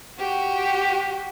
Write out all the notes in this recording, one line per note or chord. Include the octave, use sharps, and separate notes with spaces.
F#4 G4